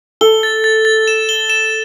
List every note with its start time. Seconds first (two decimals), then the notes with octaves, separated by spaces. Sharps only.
0.21 A4 G7
0.43 A6
0.64 A6
0.85 A6
1.08 E7
1.29 G7
1.50 E7